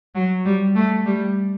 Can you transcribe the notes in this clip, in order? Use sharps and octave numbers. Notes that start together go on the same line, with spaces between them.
F#3
G3
A3
G3